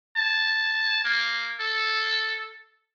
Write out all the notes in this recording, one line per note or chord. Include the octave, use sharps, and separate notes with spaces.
A5
A#3
A4